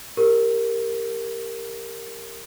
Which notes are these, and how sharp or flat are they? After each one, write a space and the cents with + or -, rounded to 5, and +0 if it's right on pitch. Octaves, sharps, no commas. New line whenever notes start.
G4 +25 A#4 -5